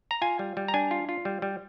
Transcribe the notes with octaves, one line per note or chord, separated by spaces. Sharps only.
A#5
F4 G#5
G3
G3
A#5
D4 G#5
F4
F4
G3
G3